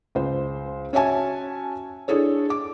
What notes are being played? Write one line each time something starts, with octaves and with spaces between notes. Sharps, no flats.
C#2 C5
C#4 F#4 C#5 E5 G#5 A5
D4 E4 G#4 A4 C#5
D6